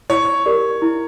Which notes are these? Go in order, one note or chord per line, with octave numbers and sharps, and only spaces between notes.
E4 C#5
G4 A#4 D5
E4